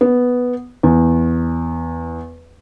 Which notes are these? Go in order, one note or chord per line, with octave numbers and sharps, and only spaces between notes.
B3
E2